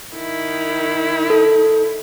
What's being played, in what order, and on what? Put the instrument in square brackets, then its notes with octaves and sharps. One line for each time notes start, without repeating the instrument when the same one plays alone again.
[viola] D#3 E4
[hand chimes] A4